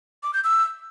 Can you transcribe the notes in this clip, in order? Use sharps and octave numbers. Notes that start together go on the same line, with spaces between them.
D6
G6
E6